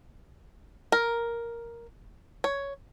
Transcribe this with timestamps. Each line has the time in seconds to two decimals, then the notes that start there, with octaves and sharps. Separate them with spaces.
0.92 A#4
2.44 C#5